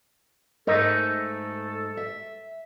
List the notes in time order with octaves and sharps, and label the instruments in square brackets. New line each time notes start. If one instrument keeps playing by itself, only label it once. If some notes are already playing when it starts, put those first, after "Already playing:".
[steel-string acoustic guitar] G#2 [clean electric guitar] A3 D#4 [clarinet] A4 [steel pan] A#4 D#5
[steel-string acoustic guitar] E5